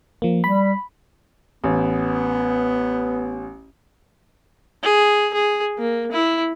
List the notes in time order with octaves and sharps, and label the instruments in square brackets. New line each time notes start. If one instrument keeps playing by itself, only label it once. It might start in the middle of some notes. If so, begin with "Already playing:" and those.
[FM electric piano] F3 A#3
[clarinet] G3 [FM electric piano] B5
[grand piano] A1 [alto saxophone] B3
[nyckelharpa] G#4
G#4
A#3
E4